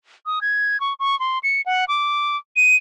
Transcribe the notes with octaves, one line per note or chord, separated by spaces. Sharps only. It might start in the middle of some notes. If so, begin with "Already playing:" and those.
D#6
G#6
C#6
C#6
C6
C#7
F#5
D6
D#7